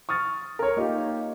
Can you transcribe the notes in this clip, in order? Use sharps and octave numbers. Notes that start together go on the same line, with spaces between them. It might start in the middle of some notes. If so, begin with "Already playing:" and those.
C#6 D#6 F6 A6
A#4 C#5
A#3 D#4 F4 G4